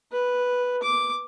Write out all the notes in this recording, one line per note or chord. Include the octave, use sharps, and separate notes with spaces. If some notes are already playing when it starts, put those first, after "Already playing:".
B4
D6